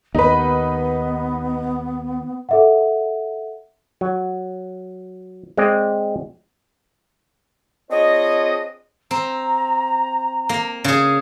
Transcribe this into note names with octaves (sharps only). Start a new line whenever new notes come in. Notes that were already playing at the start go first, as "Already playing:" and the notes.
D#2 B3 D#4 B4
A4 E5 F#5
F#3
G#3 C4 D5 D#5
C4 D4 F4 G#4 C#5 D#5
C4 A#5
A#3
C#3 G#4